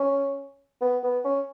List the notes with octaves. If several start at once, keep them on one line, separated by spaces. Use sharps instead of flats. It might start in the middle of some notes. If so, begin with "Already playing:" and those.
Already playing: C#4
B3
B3
C#4